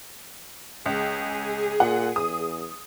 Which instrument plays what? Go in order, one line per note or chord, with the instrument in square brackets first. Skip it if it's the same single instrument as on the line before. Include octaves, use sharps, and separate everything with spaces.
[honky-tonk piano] C#2 [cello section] G#4
[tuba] A#2 [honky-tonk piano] F#5
[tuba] E2 [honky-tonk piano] D#6